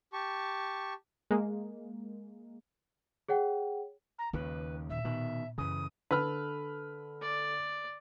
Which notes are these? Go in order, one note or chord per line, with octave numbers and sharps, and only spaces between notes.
G4 A5 C#6
G#3 A#3
G#4 C#5 F#5 G5
A#5
D#2 C#3 F4 B4
A#2 E5
B2 D#3
F#2 C#3 E3 D#6
D3 A4 B4 F6
D5